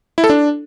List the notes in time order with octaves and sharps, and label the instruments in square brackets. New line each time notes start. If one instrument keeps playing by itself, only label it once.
[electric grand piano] E4
A4
D4